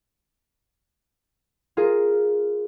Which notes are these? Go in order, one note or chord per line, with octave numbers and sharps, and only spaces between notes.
F4 G#4 A#4